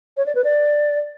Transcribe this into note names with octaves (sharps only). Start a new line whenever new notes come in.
C#5
D5
B4
D5